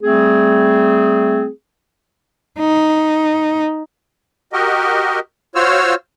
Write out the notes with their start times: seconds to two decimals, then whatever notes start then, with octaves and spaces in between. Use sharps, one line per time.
0.01 G3 A3 C4 G#4
2.60 D#4
4.53 F#4 G4 A#4 D#5
5.55 F4 F#4 C5 C#5 E6 F6